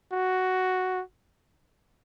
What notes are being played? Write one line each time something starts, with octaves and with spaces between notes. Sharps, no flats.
F#4